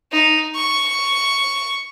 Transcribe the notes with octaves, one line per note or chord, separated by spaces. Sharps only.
D#4
C#6